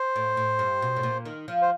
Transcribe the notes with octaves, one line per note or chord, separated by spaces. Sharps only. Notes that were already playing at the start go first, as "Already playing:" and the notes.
Already playing: C5
A2
A2
G2
B2
A2
A#2
D#3
F3
C5